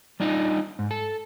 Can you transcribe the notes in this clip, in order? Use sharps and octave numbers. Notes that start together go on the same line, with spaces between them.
G3 D4 D#4 F4
G#2
A4